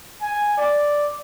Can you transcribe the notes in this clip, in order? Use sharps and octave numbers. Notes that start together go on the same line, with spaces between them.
G#5
D5